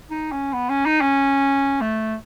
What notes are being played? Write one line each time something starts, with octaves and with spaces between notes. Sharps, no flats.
D#4
C#4
B3
C#4
D#4
C#4
A3